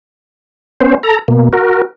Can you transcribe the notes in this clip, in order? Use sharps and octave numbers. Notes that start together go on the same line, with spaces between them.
B3 C#4 C5
A4 A#5
B2 A#3
F#4 A#4